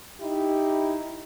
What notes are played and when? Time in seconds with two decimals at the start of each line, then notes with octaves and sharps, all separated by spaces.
0.20 D#4 E4 G4